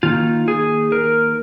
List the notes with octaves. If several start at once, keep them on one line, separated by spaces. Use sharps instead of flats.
D#3 A#3 D#4 F4
G#4
A#4